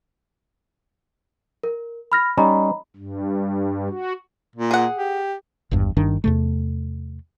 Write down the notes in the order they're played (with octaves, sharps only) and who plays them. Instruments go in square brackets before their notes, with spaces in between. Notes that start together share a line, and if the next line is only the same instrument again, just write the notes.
[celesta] A#4
B5 F6 A#6
[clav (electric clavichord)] G3 C#4 D#4 [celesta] D#5 A#5 B5
[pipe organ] G2
F#4
[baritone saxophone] A#2
[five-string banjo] G#4 F#5
[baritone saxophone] G4
[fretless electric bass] G#1 E2 G2
G1 G2 D#3 D4
E2 C3 A3